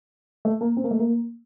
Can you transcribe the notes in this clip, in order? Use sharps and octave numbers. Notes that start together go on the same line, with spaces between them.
A3
A#3
C4
A#3
A3
A#3